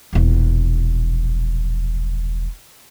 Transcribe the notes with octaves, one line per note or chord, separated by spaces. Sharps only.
E1 A#1